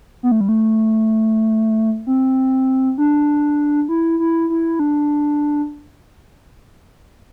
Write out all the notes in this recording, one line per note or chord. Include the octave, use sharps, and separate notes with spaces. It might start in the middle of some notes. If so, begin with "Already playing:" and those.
B3
A3
G3
A3
C4
D4
E4
E4
E4
D4